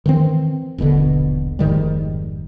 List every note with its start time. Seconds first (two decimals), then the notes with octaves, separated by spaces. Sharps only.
0.06 D#3 E3 B3 C4
0.78 D#1 A#1 B2 D3
1.59 F1 G#2 D#3 G3